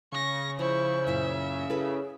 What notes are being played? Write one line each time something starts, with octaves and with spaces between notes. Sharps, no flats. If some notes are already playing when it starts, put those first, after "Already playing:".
C#3 C#6 A#6
F3 E4 C5 C#6
F#2 A#2 E4 E5
E4 G#4 A4 B4